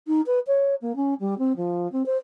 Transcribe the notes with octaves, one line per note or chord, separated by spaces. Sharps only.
D#4
B4
C#5
A#3
C#4
G3
C4
F3
C4
C5